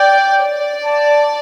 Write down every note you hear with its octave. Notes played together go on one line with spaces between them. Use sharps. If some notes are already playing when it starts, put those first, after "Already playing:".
Already playing: D5 G5
D5
A5